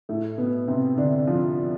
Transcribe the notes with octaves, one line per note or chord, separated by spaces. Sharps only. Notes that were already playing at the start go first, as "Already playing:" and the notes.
A2 A3
B2 B3
C3 C4
D3 D4
F3 F4